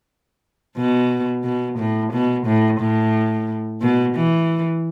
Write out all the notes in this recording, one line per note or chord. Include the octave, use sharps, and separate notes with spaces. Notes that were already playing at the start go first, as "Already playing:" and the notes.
B2
B2
A2
B2
A2
A2
B2
E3